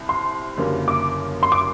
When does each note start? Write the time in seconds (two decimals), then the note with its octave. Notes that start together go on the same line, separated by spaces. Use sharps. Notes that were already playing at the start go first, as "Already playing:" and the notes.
Already playing: C2 C3
0.09 C6
0.57 F#1 F#2 D3 G3 A#3
0.88 D6
1.43 C6
1.52 D6